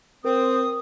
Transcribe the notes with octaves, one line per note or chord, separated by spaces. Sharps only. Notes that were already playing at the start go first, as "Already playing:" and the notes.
C4 A#4 D#6